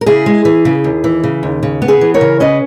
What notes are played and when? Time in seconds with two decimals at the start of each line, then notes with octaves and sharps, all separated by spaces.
0.01 A#4
0.06 C#3 E4 G#4
0.26 G#3
0.45 E3
0.65 C#3
0.84 D#2
1.04 E3
1.23 C#3
1.43 D#2
1.63 C#3
1.82 B3
1.88 G#4 B4
2.01 E3
2.14 A#4 C#5
2.21 C#3
2.40 C#4 B4 D#5